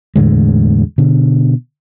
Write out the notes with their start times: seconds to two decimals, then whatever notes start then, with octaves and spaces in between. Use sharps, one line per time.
0.16 E2 A2 D3 G#3
0.98 B2 D3